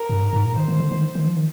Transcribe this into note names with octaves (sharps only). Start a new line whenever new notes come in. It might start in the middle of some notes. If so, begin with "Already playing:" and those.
Already playing: A#4
G2
G#2
G#2
A#2
D#3 C5
D#3
D3
D#3
D#3
F3
D#3